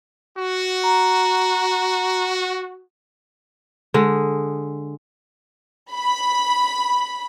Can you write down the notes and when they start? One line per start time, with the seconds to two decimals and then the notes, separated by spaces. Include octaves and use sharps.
0.37 F#4
0.84 A#5
3.94 D3 G#3
5.94 B5